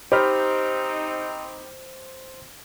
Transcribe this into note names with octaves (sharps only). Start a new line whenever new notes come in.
C4 D#4 G4 C5 B5 F6